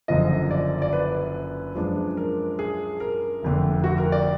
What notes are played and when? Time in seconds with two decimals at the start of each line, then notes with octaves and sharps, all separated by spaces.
0.08 F#1 F#2 D3 F3 D#5
0.51 D5
0.82 D5
0.93 B4
1.76 F#2 F3 G#3 D4
2.17 A#4
2.59 G#4
3.00 A#4
3.43 F1 F2 D3
3.84 F#4
3.98 A#4
4.12 D5